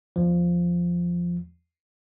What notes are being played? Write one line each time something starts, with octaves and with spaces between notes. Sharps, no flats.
E2 F3